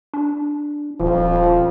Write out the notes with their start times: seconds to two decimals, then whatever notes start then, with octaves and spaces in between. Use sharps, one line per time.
0.14 D4
1.00 D#1 F3